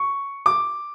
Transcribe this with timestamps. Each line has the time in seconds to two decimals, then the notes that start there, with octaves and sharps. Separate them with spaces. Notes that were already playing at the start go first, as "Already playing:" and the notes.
Already playing: C#6
0.46 D6